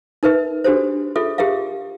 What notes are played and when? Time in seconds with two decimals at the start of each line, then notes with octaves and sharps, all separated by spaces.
0.23 D#4 A#4 B4 E5
0.64 D4 F#4 G4 A4 C5
1.16 F4 G#4 A4 E5
1.38 G4 G#4 A#4 E5 F5